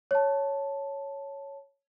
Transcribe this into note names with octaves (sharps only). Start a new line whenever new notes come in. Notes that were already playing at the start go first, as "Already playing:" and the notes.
C#5 A5